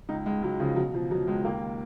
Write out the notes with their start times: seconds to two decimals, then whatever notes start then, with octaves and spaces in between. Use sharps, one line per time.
0.09 C#2 D#4
0.26 C#2 G#3
0.42 C#2 F#3
0.59 C#3 F3
0.76 B2 F#3
0.94 B2 F3
1.11 B2 F#3
1.27 C#2 G#3
1.44 D#2 A#3